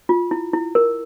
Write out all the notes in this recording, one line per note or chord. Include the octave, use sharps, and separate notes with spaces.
F4
E4
E4
A#4